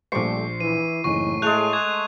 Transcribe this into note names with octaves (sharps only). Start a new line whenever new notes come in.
A#1 G3 A3 C5 C#6 D6 C7
E3 E4 D#7
F#1 A2 E3 D#4 C#6
G#3 A3 G#4 F#6 F7
D6 G#6